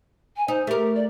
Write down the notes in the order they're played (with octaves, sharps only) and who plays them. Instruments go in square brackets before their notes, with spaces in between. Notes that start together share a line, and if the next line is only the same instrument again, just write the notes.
[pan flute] G#5
[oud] D#4 [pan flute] C5
[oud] A3 A#4 [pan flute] G4
[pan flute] D5